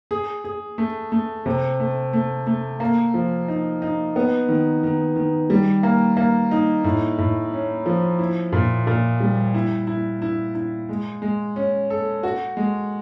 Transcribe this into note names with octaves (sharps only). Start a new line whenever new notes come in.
G#4
G#4
A3
A3
C3
A3
A3
A3
A#3
F3
D#4
D#4
B3
D#3
D#3
D#3
G3
A#3
A#3
D#4
A2
A2
C#4
F3
E4
A#2
A#2
G3
E4
E4
E4
E4
G#3
G#3
C#4
A4
F#4
G#3